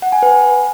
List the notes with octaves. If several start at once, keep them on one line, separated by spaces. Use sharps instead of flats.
F#5
G#5
B4